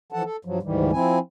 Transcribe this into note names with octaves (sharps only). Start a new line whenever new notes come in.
E3 F3 A4 F#5 A5
A4
G2 F3 F#3
D2 G#2 D#3 E3 G3
F3 C4 E4 G#5